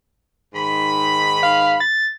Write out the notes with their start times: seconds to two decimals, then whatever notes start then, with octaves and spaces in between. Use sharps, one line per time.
0.54 G#2 D#3 B5
1.43 F5
1.80 A6